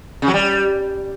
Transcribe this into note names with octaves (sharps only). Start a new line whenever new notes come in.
C#3
F#3
G3